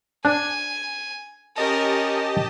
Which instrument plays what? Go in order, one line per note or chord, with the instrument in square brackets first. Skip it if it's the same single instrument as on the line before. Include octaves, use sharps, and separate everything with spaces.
[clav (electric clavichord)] D4 [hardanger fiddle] G#5
[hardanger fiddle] C#4 A#4 [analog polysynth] G4 D#5 A5